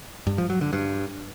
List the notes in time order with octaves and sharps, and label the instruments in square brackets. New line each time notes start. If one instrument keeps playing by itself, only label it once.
[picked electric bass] G2
F3
F#3
D3
G2